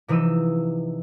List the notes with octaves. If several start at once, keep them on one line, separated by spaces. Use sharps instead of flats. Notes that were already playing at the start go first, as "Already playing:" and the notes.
C3 E3 F3 D#4 E6 D#7